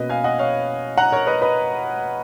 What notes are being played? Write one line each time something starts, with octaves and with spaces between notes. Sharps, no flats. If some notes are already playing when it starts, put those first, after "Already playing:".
Already playing: B2 A#3 C#4 B4 D#5
F5 G#5
D#5 F#5
C#5 F5
F#5 A#5
A#4 C#5
B4 D#5
B4 D#5